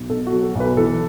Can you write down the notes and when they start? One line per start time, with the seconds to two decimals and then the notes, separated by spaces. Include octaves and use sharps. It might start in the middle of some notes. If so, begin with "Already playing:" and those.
Already playing: B1
0.09 B2 A4
0.26 F#4
0.32 F#3
0.43 A4
0.55 B1
0.60 B4
0.77 E3 A4